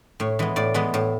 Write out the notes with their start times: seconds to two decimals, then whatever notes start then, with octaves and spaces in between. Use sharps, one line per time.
0.20 A2 C#5
0.39 E3 G#3 B3
0.56 A2 D5
0.74 E3 G#3 B3
0.94 A2